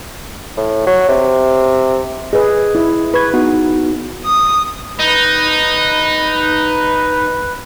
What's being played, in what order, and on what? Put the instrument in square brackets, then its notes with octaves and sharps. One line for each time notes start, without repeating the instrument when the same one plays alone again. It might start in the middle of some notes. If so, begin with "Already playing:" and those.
[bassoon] A2
F#3
C3
[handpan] G#4 B4 [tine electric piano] D#5
[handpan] E4
[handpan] B4 [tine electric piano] B5 C#6 G#6
[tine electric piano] B3 D#4 F#4
[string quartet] D#6
[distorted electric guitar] D#4 [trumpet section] B4